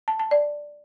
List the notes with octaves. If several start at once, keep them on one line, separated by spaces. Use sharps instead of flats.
A5
A5
D5